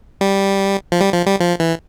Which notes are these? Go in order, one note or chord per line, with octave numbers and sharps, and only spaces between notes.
G3
F3
G3
F3
G3
F3
E3